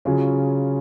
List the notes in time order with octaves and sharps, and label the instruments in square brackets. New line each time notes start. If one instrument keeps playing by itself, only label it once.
[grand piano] C#3 F#3 C#4 F4 G#4